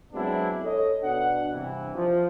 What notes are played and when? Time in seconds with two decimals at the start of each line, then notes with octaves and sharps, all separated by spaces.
0.13 F#3 G#3 B3 C4 D4 E4
0.63 A4 C#5 D#5
1.02 B2 D4 F#5
1.51 G2 C3 E3
1.94 F3